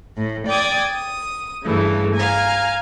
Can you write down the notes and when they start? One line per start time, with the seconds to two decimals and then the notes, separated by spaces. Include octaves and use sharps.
0.17 A2
0.47 D5 G5 D6 D#6 G#6
0.90 D#6
1.65 G2 C#3 E3 A3
2.15 F5 G#5 A#5